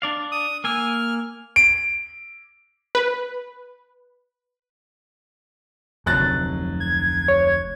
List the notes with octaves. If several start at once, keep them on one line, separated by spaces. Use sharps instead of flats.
D4 D5 F5
D#6
A#3 G#5 E6 F6
D7
B4
F1 D2 F#3 F#6 A6
G#6
C#5